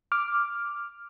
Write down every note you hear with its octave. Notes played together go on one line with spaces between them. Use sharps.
D6 F6